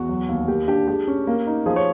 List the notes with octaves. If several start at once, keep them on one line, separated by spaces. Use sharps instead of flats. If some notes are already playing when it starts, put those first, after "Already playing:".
Already playing: E2 F#4
F#3
D#2
A#3 G4
D4 G4
G#3 G4
C#4
A#3
D#4
F3 G#4
C#5